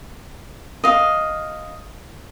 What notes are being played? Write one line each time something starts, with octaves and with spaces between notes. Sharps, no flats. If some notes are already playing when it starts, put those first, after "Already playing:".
D#5 F5